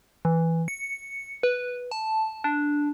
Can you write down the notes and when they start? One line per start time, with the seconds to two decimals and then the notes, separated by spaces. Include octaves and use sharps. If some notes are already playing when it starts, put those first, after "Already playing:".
0.25 E3
0.68 C#7
1.43 B4
1.91 A5
2.44 D4